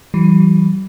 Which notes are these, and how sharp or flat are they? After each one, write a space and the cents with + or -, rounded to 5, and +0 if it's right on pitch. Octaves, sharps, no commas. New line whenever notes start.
E3 +0 G3 -40